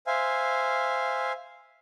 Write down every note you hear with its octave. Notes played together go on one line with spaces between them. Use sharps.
C5 E5 F5 G#5